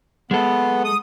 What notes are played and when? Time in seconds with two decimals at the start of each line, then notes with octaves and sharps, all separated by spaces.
0.31 G#3 B3 A4
0.85 D#6